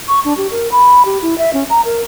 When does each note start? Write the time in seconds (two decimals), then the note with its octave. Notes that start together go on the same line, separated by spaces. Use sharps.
0.08 C#6
0.25 D4
0.37 G4
0.51 A#4
0.72 B5
1.05 G4
1.22 E4
1.38 E5
1.53 C#4
1.70 A#5
1.85 A#4